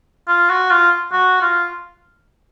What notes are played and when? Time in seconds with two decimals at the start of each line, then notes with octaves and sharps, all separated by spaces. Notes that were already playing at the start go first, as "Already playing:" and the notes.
0.28 F4
0.50 F#4
0.71 F4
1.12 F#4
1.42 F4